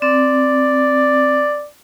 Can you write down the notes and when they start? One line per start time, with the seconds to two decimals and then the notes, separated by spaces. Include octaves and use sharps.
0.02 C4 D5